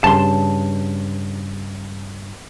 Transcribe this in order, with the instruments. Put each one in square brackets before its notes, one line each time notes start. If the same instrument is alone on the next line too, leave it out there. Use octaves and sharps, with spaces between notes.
[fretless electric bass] G2 C#3 [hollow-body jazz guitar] A5 C6